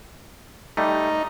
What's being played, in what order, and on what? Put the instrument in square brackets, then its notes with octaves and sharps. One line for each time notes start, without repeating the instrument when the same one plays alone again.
[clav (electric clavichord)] G3 A3 [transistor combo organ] D#4